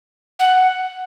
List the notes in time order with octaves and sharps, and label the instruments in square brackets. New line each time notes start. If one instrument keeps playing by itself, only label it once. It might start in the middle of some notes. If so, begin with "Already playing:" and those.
[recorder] F#5